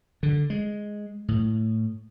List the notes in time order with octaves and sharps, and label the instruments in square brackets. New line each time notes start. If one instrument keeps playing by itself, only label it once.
[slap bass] D3
G#3
A2